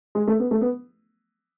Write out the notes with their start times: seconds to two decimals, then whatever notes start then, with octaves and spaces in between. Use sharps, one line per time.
0.15 G#3
0.28 A3
0.39 B3
0.51 A3
0.61 B3